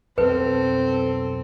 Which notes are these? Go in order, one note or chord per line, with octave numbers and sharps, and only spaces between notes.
B1 F2 C4 A4 B4